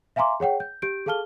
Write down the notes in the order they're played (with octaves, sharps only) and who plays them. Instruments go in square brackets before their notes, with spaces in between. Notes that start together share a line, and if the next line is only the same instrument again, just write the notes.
[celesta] E5 F5 G#5 A#5 C6 D6
G#4 C#5 F#5 G5
G6
G4 G6 D7
G#4 A4 F5 A5 F6 G7